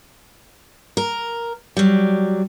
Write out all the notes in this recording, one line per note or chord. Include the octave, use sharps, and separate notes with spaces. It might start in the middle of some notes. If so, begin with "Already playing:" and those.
A#4
F#3 G3